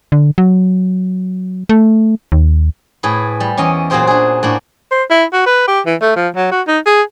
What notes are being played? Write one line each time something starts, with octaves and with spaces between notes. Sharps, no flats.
D3
F#3
A3
D#2
A2 G#4 B4
G3
E2 C#4 D5 D#5
A#2 F#3 F#4 G#4 C5 G5
D4 G#4
A2 A#3 D4 F#4
C5
E4
F#4
B4
G4
E3
A3
F3
F#3
F#4
D#4
G#4